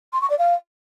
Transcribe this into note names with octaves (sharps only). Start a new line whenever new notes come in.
C6
C#6
D5
F5